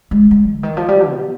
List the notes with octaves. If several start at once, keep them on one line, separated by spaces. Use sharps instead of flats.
G#3
G#3
D3
D#3
F3
G3
B2